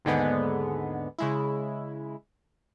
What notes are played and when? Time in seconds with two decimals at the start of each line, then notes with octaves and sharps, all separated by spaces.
0.05 D#2 G#2 D3 G#3 B3
1.18 C#3 G#3 E4